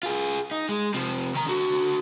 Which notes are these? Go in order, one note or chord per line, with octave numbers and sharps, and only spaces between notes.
F4 G#4
D#4
G#3
C3 F3
D#3 A#5
D3 F#4